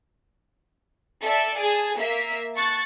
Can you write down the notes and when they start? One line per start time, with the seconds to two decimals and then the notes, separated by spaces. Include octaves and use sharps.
1.22 A4 D5 E5 A5
1.57 G#4 G#5 A5
1.99 A#3 E5 B6
2.55 A5 C#6 F#6 A6